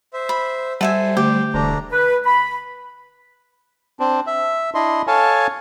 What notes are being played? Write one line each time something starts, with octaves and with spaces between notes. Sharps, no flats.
C5 E5
B5
G3 A4 C5 E5 F#5 G#5
D3 A3 G4
E1 D3 A3 D4 A#5
B4
B5
C4 D4
E5
D4 E4 D#5 C6
A4 C#5 F5 G#5 A5